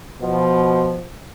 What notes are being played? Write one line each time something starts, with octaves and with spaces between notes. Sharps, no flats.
B2 F3